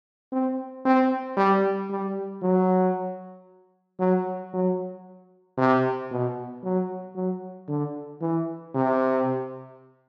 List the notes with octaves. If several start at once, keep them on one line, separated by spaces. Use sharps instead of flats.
C4
C4
G3
G3
F#3
F#3
F#3
C3
B2
F#3
F#3
D3
E3
C3